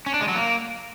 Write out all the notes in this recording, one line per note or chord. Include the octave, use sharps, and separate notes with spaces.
C#4
D4
G#3
F#3
A#3